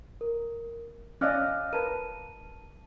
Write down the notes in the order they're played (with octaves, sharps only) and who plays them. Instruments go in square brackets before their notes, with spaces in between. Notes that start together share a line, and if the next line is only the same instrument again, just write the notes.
[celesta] A#4
[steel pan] C#4 D5 D#5 [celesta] F5 F6 F#6
[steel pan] A#4 B4 [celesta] A5 D#7